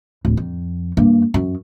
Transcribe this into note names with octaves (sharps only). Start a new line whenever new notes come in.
D1
F2
G2 A#3
F#2